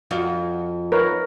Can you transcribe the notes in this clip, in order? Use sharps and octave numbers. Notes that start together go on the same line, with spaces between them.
F2 F4 F#4
A#4 B4 C#5